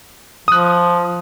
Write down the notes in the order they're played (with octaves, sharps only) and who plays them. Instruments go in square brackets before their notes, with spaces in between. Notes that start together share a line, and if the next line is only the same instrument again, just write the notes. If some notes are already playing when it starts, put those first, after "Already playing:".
[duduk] F3 [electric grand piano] D#6 F#6